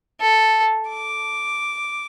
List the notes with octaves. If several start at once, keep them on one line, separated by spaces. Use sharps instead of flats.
A4
D6